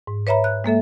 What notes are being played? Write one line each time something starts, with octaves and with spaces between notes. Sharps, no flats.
G#2
B4 C#5 E5 A#5 B5
F#6
G#3 A#3 A4 E5